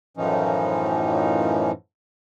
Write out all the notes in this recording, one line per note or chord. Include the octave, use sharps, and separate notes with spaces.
F#2 A2 E3 F3 C#4 D#4